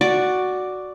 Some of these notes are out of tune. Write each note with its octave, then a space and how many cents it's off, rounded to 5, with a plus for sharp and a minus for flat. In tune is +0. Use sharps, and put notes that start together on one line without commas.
F#4 +0 D5 +0